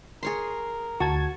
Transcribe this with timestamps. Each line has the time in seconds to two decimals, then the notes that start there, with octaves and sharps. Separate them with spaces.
0.23 G#4 A#4 C#5 C6
1.00 D2 F#4 A5 G#6